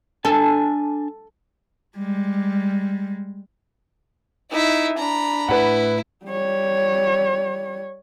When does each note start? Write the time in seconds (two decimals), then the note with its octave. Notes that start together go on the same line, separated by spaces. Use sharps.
0.25 D4 A4 G#5 A5
1.97 G3 G#3
4.51 D#4 E4 E5
4.98 D4 A#5 B5
5.48 A2 E4 B4 F#5
6.25 G3 C#5